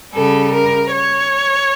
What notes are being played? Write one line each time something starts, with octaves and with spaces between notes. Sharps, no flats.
C#3 G3 A4
A#4
C#5